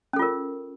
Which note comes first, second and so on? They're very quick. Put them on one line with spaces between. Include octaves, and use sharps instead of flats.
C#4 A4 F4 A#4